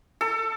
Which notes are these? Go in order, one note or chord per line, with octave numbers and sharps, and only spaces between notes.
A4